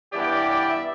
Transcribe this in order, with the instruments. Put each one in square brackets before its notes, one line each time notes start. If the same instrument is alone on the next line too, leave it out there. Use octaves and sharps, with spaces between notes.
[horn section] G2 E3 B3 E4 G4 [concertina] D5
[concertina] D5
D5
E5